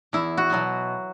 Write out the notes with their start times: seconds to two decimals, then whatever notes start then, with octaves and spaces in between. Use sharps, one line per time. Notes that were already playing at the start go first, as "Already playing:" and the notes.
0.13 E2 E4
0.37 F#4
0.50 B2 F#3 B3